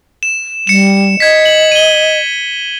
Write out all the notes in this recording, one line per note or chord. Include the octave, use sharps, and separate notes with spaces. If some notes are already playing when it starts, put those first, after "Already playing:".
E7
G3 C#7 E7
D#5 G#6 B6
F#7
D#7 G7